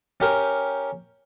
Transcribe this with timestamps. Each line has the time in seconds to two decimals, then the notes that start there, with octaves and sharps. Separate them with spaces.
0.20 C#4 G4 A#4